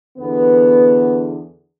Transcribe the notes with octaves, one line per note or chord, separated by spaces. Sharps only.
E2 D3 B3